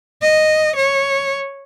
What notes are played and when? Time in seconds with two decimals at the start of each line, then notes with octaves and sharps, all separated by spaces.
0.22 D#5
0.76 C#5